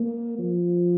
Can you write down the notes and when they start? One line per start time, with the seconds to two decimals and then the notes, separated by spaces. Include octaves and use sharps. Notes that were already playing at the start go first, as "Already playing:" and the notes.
Already playing: A#3
0.39 F3